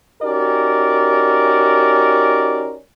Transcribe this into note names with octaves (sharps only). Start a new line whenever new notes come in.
C#4 D#4 F#4 G4 A#4 D5